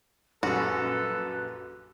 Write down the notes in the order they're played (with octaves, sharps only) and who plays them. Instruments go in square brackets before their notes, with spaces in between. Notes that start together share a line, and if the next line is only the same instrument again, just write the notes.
[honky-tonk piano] A#1 F#2 G3 [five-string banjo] F#4 [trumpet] A4 [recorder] B4